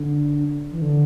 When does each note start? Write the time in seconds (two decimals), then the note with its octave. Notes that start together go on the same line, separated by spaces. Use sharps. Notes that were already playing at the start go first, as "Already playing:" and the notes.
Already playing: D3
0.71 E3
0.82 D3